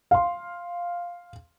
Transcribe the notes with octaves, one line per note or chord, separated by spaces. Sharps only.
F5 C6